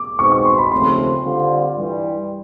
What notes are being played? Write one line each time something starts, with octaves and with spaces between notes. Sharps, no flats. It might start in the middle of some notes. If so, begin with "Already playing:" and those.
Already playing: D6
B2 G#3 C4 D#4 C#6
C#6
C6
B5
D#2 C#3 F3 A3 C4 C6
D3 G3 C4 F4
G2 E3 G3